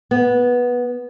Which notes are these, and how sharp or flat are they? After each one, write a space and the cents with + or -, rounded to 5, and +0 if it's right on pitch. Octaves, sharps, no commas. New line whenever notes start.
B3 -10